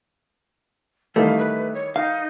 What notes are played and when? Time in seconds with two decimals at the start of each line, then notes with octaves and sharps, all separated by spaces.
1.16 D#3 E3 G3 A3 F5
1.38 B4
1.74 C#5
1.96 D#4 F5